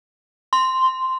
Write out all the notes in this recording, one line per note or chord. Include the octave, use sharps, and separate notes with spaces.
C6